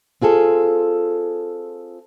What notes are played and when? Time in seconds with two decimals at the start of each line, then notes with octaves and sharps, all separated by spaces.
0.22 C4 F4 G#4 A4